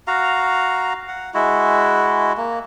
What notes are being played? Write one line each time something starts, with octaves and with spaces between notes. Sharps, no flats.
F#4 F5 A#5
F#5
G#3 E4 F#4
A#3